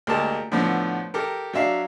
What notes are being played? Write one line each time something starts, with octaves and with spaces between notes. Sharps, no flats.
D2 G#3 A#3 G4 A#4 A5
A2 D3 F3 B3
G4 A4 A#4
F#3 D4 E5 F5